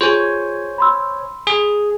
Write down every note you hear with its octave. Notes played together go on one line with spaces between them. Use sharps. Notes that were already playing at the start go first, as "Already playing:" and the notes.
F4 G#4 C5 C#5 G#5
B5 C6 E6
G#4